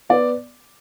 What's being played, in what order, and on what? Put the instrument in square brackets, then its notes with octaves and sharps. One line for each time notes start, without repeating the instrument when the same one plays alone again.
[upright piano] B3 D5